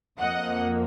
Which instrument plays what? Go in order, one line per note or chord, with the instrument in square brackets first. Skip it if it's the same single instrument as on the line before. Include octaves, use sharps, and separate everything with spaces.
[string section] F2 F3 A#3 D#5 F#5